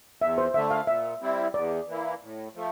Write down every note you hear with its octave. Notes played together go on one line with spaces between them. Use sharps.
E2 E5
C5
D3 A3 E5
F5
A#2 E5
G3 C4 E4
E2 D5
E3 A#3 E4
A2
F3 A3